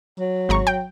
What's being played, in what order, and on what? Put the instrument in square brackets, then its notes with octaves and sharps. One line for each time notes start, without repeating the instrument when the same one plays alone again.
[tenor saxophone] F#3
[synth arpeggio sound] G#1 A#5 C#6
G5